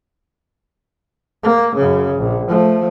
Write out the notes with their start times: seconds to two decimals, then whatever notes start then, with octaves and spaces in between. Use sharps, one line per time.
1.43 A#3
1.76 F#2 C#3
2.18 A#1
2.48 F3 A3